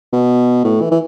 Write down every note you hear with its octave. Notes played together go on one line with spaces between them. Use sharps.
B2
A2
E3
E3